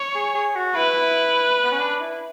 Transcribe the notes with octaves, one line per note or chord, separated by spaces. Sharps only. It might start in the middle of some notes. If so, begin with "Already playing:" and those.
Already playing: C#5
G#4
G#4
F#4
E4 B4
B3
C#4
D4
E4